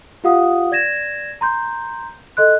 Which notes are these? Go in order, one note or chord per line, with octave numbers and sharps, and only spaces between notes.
F4 G4 F5 F#5 D#6
D5 G#6 A#6 E7
A#5 C6 G6
A4 D#5 C6 F#6